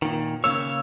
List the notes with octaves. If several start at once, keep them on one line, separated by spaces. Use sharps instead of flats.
A#2 D#3
C#3 A#3 C#5 E6